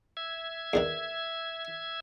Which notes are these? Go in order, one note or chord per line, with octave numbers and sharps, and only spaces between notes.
E5 G#6
E2 D3 D#3